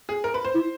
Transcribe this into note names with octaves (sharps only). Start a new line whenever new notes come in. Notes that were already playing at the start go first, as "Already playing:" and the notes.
G#4
A#4
B4
C5
E4